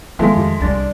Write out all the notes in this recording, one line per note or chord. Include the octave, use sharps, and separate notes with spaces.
D#3 F3 G#3 A3 C4
F2 F4 G4
C2 D4 A#5 C6 A6